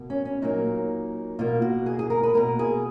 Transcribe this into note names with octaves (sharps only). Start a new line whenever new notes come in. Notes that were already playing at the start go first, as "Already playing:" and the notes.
Already playing: B2 A#3
C#4
C#4
A#2 F#3 A#3 D#4
B2 A#3 F4
F#4
G#4
G#4
A#4
B4
B2 A#3 A#4
G#4